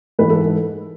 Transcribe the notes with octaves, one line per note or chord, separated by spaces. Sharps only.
G#2 E3 B4
A4